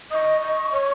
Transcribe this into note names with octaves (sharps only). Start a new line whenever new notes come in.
D#5 C#6 D#6
D#5
C#5